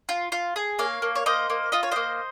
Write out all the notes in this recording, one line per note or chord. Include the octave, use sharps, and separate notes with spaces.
F4
F4
G#4
A#3 C#5 F5
A#3
C#5
A#3 C5 D#5
A#3
F4 D#5
C#5
A#3 C5 D#5